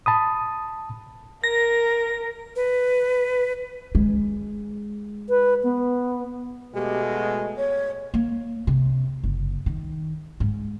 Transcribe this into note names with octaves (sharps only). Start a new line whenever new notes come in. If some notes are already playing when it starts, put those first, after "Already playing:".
A5 B5 D#6
A#4 A#6
B4
G#3
B4
B3
B2 G#3 A3 G4
F#4
C#5
A#3
C3
F#1
D#3
G#2